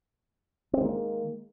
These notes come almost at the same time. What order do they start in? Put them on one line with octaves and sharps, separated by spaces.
C4 G#3 D#3 A#3